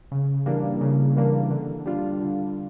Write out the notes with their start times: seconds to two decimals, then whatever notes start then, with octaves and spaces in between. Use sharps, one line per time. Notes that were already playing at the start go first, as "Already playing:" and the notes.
0.12 C#3
0.46 E3 G3 A#3 D4
0.81 C#3
1.17 E3 G3 A#3 D4
1.51 D3
1.86 G3 D4 F4
2.21 D3